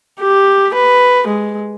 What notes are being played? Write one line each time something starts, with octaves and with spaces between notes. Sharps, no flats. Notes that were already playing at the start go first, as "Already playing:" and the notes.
G4
B4
G#3